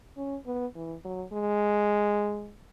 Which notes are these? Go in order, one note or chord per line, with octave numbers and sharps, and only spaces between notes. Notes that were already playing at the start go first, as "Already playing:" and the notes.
C#4
B3
E3
F#3
G#3